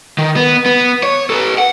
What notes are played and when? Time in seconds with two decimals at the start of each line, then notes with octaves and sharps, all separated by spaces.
0.18 D#3
0.36 B3
0.66 B3
1.03 C#5
1.30 A4 B4
1.58 F#5